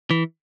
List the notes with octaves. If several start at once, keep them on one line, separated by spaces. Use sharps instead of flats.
E3